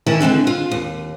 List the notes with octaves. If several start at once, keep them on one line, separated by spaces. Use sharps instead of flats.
D#3 E3 E4 A5
D3 G#3 C4 D4
F4
D#2